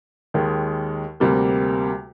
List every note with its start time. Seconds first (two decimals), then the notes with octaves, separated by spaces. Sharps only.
0.34 D#2 D#3 G#3
1.20 D2 C3 G3 A#3